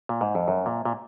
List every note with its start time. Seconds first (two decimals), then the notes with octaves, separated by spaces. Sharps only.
0.09 A#2
0.21 G#2
0.35 F2
0.48 F#2
0.66 A#2
0.85 A#2